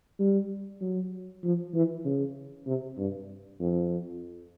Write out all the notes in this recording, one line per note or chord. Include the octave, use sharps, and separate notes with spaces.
G3
F#3
F3
E3
C#3
C3
G2
F2